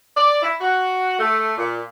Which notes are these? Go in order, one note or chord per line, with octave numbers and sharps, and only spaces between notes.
D5
E4
F#4
A3
A#2